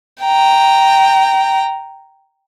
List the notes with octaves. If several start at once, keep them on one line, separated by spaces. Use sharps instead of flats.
G5 A#5